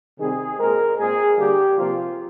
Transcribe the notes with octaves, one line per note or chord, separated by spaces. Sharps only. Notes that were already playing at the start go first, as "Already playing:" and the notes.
C3 D#3 G3 C4 G#4
A#2 G#3 C4 A#4
A#2 G#3 C4 G#4
D3 G3 A#3 G4
C3 F3 A#3 F4